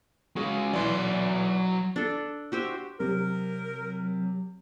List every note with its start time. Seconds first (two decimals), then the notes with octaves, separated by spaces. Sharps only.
0.36 G#3 C#4 F#4 G#4
0.74 B1 E3 F#3 D5 C6
1.96 D4 A4
2.52 F#4 G4 C5 E5
3.00 C3 F#3 A#4